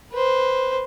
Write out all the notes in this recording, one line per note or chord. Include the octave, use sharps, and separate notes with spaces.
B4 C5